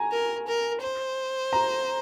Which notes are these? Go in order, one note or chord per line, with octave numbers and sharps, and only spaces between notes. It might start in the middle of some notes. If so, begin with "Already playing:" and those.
Already playing: G#5 A#5
A#4
A#4
C5
A#5